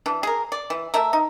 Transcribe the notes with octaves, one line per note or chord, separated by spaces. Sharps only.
E3 D4
G#4 A#4
D5
E3
A3 A#4 E5
D#4